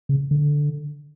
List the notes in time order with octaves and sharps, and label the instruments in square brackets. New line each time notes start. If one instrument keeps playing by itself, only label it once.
[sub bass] C#3
D3